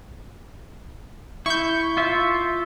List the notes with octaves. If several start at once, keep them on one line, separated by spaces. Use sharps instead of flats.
E4 C#6 G6
F4 E5